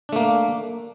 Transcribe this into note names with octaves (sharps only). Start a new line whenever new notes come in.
A3 A#3 D4